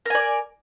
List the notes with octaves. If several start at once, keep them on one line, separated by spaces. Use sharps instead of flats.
A#4 D5 G#5